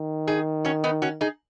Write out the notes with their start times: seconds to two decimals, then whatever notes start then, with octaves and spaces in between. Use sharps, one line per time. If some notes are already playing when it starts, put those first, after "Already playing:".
Already playing: D#3
0.28 D#4 G#4
0.65 C#4 F#4
0.84 B3 D#4
1.02 C#4 F#4
1.21 D#4 G#4